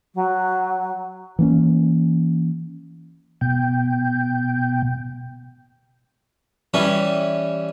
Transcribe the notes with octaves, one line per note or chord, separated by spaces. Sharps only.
F#3
E3 A#3 C#4
B2 G5
E3 G3 C#4